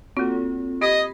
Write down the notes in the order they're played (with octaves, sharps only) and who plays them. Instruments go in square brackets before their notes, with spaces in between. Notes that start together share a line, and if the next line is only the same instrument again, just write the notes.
[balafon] A#3 F#4 [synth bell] C4 F4 A4
[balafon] G4 [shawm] D#5 [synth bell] B5 G#6 B6